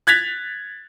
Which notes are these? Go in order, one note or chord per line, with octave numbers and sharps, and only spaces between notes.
F#6 G#6 A6 B6 F7